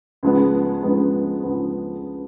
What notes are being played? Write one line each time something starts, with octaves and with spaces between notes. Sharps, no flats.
C#2 C#3 F3 G#3 B3
C#2 C#3 F3 G#3 B3
C#2 C#3 F3 G#3 B3